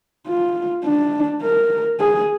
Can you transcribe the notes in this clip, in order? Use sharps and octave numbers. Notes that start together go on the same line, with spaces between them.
F4
D4
A#4
G#4